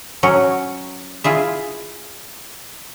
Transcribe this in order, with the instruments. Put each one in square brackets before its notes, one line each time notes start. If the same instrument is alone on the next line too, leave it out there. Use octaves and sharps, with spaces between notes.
[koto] F#3 C#4 F#4
E4 F4 G#4 E5